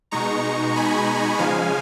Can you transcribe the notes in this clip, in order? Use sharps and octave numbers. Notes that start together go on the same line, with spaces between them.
B2 G#3 D#4 A#5 C#6
G#5 B5
C#3 F3 G#3 F5 G#5